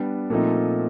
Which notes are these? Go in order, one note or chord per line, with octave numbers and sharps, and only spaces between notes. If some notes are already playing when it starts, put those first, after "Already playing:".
Already playing: G3 B3 D4
A#2 F3 A3 C4 D#4